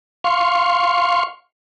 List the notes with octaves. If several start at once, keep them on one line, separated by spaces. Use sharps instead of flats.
F5 C6 C#6